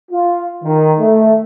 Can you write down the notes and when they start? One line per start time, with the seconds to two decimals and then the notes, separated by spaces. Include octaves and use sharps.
0.11 F4
0.63 D#3
0.99 A3